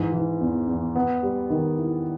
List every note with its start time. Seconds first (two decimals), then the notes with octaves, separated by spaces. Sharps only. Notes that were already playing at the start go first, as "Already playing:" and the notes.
Already playing: G#2 E3
0.12 E3
0.41 E2
0.68 E2
0.96 B3
1.23 G3
1.50 D#3
1.78 E4